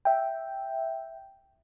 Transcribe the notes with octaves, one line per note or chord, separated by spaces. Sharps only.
E5 G5